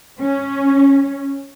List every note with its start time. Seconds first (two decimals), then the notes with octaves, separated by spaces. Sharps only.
0.21 C#4